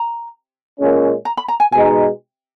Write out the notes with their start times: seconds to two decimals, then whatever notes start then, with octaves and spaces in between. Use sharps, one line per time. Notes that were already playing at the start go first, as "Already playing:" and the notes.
Already playing: A#5
0.79 A#2 G#3 C#4
1.25 A#5
1.37 B5
1.48 A#5
1.60 G#5
1.72 B2 G#3 D#4 G#5